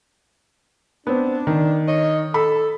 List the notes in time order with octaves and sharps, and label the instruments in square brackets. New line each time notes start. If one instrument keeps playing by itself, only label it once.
[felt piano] B3 C4 [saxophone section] D4
[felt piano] D#3
[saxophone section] C#5 D#5
[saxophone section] A4 [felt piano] B5